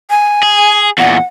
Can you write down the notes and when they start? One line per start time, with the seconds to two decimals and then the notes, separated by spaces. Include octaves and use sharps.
0.10 G#5
0.43 G#4
0.98 E2 A#2 F#5